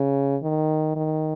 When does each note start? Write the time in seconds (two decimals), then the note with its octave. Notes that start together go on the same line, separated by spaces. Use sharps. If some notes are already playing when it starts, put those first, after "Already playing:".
Already playing: C#3
0.43 D#3
0.96 D#3